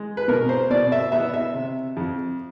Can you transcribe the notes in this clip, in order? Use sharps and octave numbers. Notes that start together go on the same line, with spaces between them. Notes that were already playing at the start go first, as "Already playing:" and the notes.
Already playing: G#3
B4
B2 A#4
C5
B2 D5
E5
B3 E5
E5
C3
F2